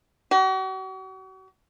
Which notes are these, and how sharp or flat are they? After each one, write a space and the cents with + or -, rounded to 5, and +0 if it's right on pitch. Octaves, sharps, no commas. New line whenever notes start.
F#4 +40